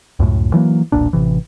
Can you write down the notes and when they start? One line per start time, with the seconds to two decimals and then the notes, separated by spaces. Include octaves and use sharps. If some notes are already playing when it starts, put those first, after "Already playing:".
0.19 C#2 F#2 A2
0.54 E3 F#3 A#3
0.92 E1 B1 A#2 D4
1.13 A1 C3 E3